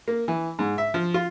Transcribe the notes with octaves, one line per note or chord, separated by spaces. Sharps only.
A#3
E3
G#2
E5
F3
F4